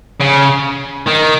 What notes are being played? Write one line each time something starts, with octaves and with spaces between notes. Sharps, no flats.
C#3
D#3